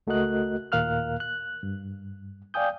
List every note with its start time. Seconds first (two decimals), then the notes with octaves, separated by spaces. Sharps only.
0.07 C#2 A3 F#4 A#4 D#5 F#6
0.72 D#2 A#2 A#4 F5 F6 F#6
1.20 F#6
1.63 G2
2.54 D5 F5 G5 G#5 D#6 G6